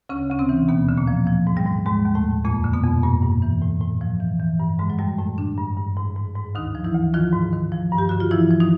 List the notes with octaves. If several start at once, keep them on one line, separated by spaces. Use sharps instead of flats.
D2 C#3 C#4
D2 C#4
C3 C4
E3
D#2 B2 B3
D3
A#2 A#3
F3
F3
G#2
G3
G#2
D#2 G#2 G#3
D#2
A2 A3
D#2
F2 A#2 A#3
D3
B2 B3
F2
G2 A#2 A#3
G2
E3
A2
A2
F3
E3
E3
G2
G#2 D3 G#3
F#3
F#2 G3
F#2 A2 A3
D3 D4
G2
G2
G#2
G#2
G#2
D2 D#3 D#4
F3
E3 E4
D2
D#3 F3 F4
G#2
D#3
F3
G2
G4
D3 F#4
F4
E3 F3 E4
F3
D#3 D#4